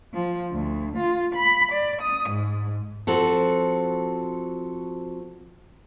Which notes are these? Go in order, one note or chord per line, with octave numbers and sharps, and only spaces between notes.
F3
D2
F4
B5
D5
D#6
G#2
F3 C4 F#4 A4